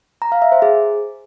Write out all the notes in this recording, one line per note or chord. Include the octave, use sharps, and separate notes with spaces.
A#5
F5
E5
C5
G#4